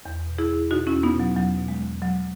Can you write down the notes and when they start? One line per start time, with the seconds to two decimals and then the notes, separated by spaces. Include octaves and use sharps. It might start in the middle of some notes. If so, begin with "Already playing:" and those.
0.06 E2
0.27 B2
0.38 E4 G#4
0.49 E2
0.70 B2 D#4 F#4
0.87 C#4 E4
0.92 E2
1.03 B3 D#4
1.14 B2
1.19 F#3
1.36 E2 F#3
1.58 B2
1.68 G#3
1.79 E2
2.01 B2 F#3